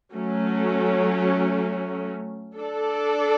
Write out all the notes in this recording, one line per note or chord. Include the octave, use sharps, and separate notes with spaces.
F#3 A3 C#4
D4 A4 D5